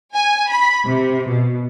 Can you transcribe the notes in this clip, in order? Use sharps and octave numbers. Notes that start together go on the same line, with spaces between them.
G#5
B5
C3
B2